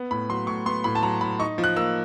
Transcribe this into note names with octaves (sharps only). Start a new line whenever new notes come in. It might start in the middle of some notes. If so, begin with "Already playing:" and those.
Already playing: B3
A2 B5
F#3 C6
A2 C#6
B3 C6
A2 B5
A5
F#3 A#5
A2 B5
D#4 C#6
F3
F#6
A#3 E6